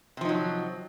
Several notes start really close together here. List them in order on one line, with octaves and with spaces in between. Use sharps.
C3 F3 D#4 F#3